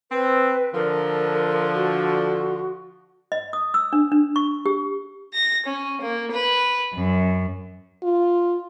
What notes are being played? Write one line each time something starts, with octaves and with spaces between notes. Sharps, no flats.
C4 B4
D3 F3 A#4
F#4
D#5
D#6
E6
D4
D4
C#6
G4
A#6
C#4
A#3
B4
F#2
F4